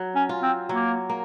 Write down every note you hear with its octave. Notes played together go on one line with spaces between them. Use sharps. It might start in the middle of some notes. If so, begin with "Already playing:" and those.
Already playing: F#3
C#4
F4
C4
F#3 A#3
A#3